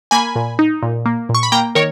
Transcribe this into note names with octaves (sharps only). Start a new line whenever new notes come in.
A#3 G#5 B5
A#2
D#4
A#2
A#3
A#2
C#6
B5
A#3 G5 A#5
D#3 A#4 C#5